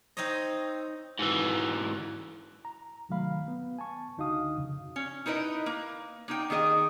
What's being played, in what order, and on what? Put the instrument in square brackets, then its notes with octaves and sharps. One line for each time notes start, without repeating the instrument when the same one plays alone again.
[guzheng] C4 D#4 C5 C#5 D#5
[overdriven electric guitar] G#2 E3
[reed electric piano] A#5
C2 D#3 F#3 A3 F5 B5
B3
G#5 A5 C#6
C#2 D3 D#4 F#4 F5 D#6
F2 C#3
[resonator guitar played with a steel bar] C#4
D#4 E4 A#4 B4 D#5
A#3
A#3 D#4 G5
D#3 A#3 G#4 D#5